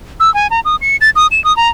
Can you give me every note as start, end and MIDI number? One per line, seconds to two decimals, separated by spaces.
0.20 0.33 88
0.34 0.47 80
0.51 0.60 82
0.65 0.76 87
0.81 0.96 97
1.01 1.10 93
1.16 1.27 87
1.31 1.43 100
1.44 1.55 87
1.57 1.68 82